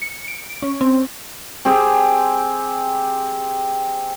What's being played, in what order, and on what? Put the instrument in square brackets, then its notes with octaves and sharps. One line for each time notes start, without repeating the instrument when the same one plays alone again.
[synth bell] C#7
D7
C#4
C4
[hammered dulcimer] C4 G4 G#4